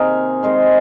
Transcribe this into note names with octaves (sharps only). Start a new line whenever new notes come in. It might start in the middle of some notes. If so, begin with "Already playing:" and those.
Already playing: C3 D#3 A#3 G#4 A#4
D#3 G#3 C4 C5